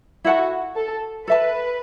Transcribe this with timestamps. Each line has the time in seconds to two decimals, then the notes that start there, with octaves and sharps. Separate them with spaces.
0.24 E4 F#4 A4 F#5 A5
0.76 A4
1.28 A4 B4 E5 A5